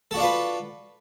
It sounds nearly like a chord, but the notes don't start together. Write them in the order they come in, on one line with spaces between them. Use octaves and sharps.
A4 F#4 D4 F4 B4